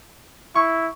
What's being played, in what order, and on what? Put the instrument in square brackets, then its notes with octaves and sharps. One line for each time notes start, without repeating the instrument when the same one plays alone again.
[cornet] E4 [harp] C#6